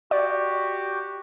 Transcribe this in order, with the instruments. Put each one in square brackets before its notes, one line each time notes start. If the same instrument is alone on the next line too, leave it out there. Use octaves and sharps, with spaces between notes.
[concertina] F#4 G4 [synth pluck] D5